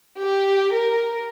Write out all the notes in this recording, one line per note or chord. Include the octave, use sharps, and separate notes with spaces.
G4
A#4